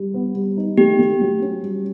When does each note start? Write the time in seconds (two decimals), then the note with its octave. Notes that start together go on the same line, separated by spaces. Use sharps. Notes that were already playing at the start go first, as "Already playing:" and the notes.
Already playing: G3
0.14 B3
0.35 G3
0.57 D#4
0.77 A3 G4
0.99 A3
1.21 F#3
1.42 C#4
1.63 G3